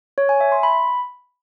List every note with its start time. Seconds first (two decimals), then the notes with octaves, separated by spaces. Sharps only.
0.18 C#5
0.29 G#5
0.40 E5
0.52 C6
0.63 B5